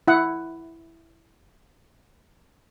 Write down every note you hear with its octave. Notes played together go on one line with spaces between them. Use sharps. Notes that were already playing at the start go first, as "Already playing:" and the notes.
E4 F#5